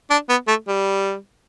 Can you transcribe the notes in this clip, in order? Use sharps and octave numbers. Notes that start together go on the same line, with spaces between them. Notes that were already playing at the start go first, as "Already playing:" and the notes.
D4
B3
A3
G3